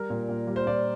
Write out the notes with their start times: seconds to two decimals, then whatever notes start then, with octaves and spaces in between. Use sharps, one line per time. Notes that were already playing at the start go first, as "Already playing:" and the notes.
Already playing: G3 A#4
0.10 A#2
0.29 A#2
0.47 G3
0.56 C5
0.67 A#2 D5